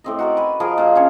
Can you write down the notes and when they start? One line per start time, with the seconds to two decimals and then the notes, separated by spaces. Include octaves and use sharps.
0.04 A2 C4 D#5
0.19 F#4 A#4 D5
0.37 B4 G#5
0.60 F3 G#4 A#4 D#5
0.78 A#2 F4
0.95 C#4 D4 C#5